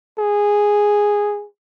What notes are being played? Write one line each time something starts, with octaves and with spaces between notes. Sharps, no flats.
G#4